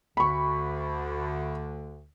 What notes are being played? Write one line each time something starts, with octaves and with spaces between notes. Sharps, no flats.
D2 D3 B5 C#6